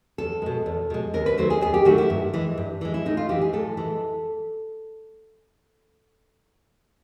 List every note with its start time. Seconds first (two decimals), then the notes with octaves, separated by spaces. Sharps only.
0.18 E2 A4
0.42 B2 G#3
0.66 E2
0.90 B2 G#3
1.14 D#2 A#4
1.26 B4
1.38 D#3 F#3 A3 C5
1.50 G#4
1.61 D#2 G#4
1.74 G4
1.85 D#3 F#3 A3 F#4
1.98 E4
2.10 G2
2.34 E3 G#3
2.58 G2
2.81 E3 G#3
2.94 E4
3.06 A2 D#4
3.17 F4
3.29 E3 G#3 G4
3.42 G#4
3.53 A2 A4
3.77 E3 G#3